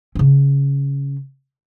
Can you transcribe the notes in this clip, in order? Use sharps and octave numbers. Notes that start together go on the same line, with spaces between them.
C#3 C#4